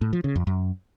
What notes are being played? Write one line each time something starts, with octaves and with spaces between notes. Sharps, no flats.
A2
F3
C#3
F2
F#2